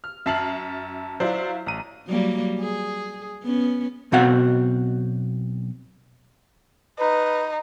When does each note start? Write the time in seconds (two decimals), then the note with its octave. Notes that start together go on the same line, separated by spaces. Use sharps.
0.04 F6
0.26 F#2 E5 A5 F6 C7 F#7
1.20 F#3 E4 F4 C5 D5
1.66 A1 A#5 D#7
2.08 F#3 G3 A#3
2.59 G#4
3.44 B3 C#4
4.12 B1 B2 C4 F#4 F5 F#5
6.99 D#4 B4